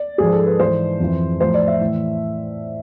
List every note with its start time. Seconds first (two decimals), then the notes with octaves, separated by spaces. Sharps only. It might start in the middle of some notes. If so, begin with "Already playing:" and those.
Already playing: D5
0.18 G#2 F3 G#4
0.33 A4
0.46 B4
0.59 G#2 E3 C5
1.00 F2 E3
1.40 A2 F3 C5
1.54 D5
1.67 E5
1.81 A2 E3